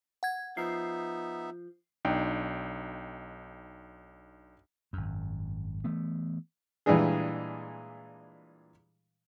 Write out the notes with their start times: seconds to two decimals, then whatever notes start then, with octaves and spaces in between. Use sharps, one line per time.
0.23 F#5 G#6
0.57 F3 B3 D#4 E5 C7
2.05 B1 D4 D#4 G5
4.93 G#1 F#2
5.84 E3 A3 B3
6.86 A#2 E3 G3 G#3 D4 G#4